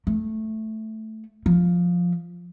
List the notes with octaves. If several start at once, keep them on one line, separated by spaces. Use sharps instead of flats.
A3
F3